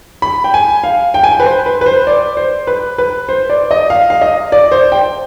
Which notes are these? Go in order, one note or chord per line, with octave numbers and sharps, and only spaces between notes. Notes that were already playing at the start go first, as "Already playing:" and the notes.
B5
G5
G#5
F5
G5
G#5
G5
B4
C5
B4
B4
C5
D5
C5
B4
B4
C5
D5
D#5
F5
F5
D#5
D5
C5
G5